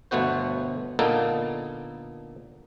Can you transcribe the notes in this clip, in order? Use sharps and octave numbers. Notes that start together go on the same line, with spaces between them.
G1 B2 A3 B3 F#4 C5
A#2 D3 A#3 B3 D#4 A4